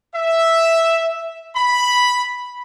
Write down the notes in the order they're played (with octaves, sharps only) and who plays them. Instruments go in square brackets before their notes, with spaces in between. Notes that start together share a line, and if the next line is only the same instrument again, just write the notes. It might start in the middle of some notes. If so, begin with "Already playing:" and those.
[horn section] E5
B5